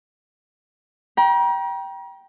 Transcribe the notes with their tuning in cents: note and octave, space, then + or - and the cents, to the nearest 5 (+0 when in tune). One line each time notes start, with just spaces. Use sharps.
G5 -5 A#5 +40